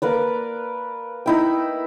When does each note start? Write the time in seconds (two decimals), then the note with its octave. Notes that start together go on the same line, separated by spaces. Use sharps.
0.02 A#3 A#4 B4 D5
1.26 D#4 E4 G5